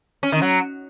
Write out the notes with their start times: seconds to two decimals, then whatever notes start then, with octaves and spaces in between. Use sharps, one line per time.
0.23 C#4
0.32 D#3
0.42 F#3